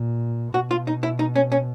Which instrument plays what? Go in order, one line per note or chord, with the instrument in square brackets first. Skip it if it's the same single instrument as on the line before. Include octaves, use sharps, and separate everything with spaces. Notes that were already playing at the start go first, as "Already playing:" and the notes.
Already playing: [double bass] A#2
[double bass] B2 [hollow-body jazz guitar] F#4
[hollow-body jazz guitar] F4
D#4
E4
D#4
C#4
C#4